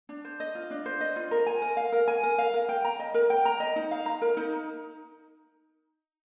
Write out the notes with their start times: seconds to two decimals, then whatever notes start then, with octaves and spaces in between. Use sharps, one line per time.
0.09 D4
0.25 C5
0.40 D#5
0.55 F4
0.71 D4
0.86 C5
1.01 D#5
1.16 F4
1.31 A#4
1.47 G#5
1.62 A#4
1.77 F5
1.92 A#4
2.08 G#5
2.23 A#4
2.38 F5
2.54 A#4
2.69 G5
2.85 A#5
3.00 D#5
3.14 A#4
3.30 G5
3.45 A#5
3.60 D#5
3.76 D#4
3.91 F5
4.06 A#5
4.22 A#4
4.37 D#4